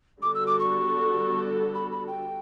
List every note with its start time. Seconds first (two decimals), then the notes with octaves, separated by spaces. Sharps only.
0.21 D3 G3 B3 F#4 A4 D6
0.35 E6
0.47 D6
0.60 C#6
1.75 B5
1.92 B5
2.08 G5